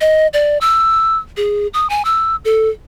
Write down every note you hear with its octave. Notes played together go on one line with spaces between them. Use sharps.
D#5
D5
E6
G#4
D#6
G#5
E6
A4